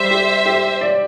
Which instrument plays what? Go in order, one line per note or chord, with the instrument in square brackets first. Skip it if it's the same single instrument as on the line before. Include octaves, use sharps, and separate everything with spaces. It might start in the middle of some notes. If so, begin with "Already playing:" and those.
Already playing: [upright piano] G3 [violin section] C5 E5
[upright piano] G4
G4
D5